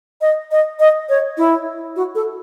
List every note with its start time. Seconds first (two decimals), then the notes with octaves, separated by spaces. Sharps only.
0.21 D#5
0.51 D#5
0.80 D#5
1.09 C#5
1.37 E4
1.96 F#4
2.15 A4